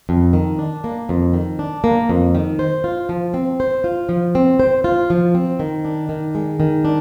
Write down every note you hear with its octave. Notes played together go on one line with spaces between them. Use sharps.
F2
D#3
D4
A#3
F2
D#3
D4
A#3
F2
D#3
C5
F4
F3
C4
C5
F4
F3
C4
C5
F4
F3
C4
D#3
D4
D#3
G#3
D#3
D4